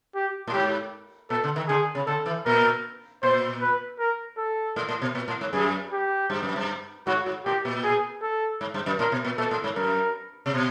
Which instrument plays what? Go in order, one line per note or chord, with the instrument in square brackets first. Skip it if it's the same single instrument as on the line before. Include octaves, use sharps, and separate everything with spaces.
[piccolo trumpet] G4
[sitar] A2
[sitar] G#2 [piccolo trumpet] G4
[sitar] A#2 [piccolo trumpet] A4
[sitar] D3
D#3
[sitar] D3 [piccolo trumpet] G#4
[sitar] C#3
[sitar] D3 [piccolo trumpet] A4
[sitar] E3
[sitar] A#2 [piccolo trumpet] A#4
[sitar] A#2 [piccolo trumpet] C5
[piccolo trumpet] B4
A#4
A4
[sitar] A2
A2
B2
A#2
A2
G#2
[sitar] F#2 [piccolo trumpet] G#4
[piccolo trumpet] G4
[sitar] G2
F#2
G2
[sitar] G#2 [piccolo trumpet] F#4
[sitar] G#2
[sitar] A2 [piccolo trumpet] G4
[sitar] A#2
[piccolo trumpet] G#4
A4
[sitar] G#2
G2
F#2
[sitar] A2 [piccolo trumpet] A#4
[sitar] B2
A#2
[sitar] A#2 [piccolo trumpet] A4
[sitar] A2
G#2
[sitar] F#2 [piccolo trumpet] A#4
[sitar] C3
B2